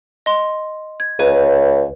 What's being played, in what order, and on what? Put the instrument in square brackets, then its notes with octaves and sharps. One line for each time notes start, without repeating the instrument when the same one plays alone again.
[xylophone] D#5 C6
G#6
[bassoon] C#2 [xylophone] B4 C#5 D#7